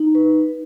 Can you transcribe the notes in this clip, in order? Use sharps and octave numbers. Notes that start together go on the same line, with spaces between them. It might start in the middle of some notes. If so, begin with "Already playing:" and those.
Already playing: D#4
B4